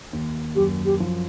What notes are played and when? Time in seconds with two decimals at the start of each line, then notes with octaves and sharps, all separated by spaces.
0.13 D#2
0.56 F#2 G4
0.86 G4
1.00 F3